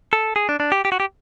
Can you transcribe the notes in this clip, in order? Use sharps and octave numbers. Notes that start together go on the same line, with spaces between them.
A4
G#4
D4
D4
G4
G4
F#4
G4